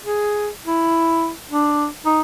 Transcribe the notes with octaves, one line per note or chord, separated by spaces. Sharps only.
G#4
E4
D4
D#4